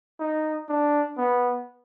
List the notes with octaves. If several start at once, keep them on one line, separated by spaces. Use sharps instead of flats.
D#4
D4
B3